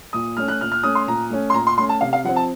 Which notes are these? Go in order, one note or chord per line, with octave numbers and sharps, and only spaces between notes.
A#2 D#6
A3 C#4 F6
F#6
A#2 F6
F6
A3 C#4 D#6
C6
A#2 A#5
A3 C#4
C6
A#2 A#5
C6
A3 C#4 C6
A5
C3 F5
F5
F3 C4 F#5
A5